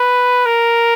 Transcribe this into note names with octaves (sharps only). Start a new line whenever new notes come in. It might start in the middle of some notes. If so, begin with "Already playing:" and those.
Already playing: B4
A#4